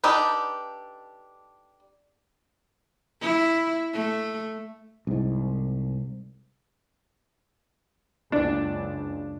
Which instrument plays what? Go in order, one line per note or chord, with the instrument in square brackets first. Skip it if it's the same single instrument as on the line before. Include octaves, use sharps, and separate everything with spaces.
[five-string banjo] D4 D#4 G4 A4 B4
[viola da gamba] E4
A3
[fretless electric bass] C2 G#2
[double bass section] F#1 C#2 [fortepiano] D4